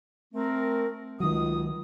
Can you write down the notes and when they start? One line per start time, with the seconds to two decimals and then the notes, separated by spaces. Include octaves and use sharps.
0.34 A3 C4 A#4
1.20 C#2 D#3 F#3 D#6